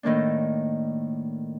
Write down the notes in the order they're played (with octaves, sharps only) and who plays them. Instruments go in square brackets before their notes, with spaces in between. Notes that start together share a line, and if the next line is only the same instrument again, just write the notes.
[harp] A2 D#3 A#3 D4